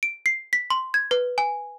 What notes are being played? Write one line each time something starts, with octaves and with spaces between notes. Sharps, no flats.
D7
C7
B6
C6
G#6
B4
G#5